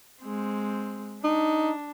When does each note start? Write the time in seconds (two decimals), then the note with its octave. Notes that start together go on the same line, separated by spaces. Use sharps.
0.22 G#3 C4
1.24 D4 D#4